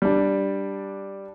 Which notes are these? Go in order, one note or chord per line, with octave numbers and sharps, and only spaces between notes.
G3 D4